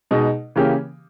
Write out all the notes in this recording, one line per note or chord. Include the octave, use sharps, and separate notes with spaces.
B2 G#3 D#4
C#3 E3 A#3 C#4 G4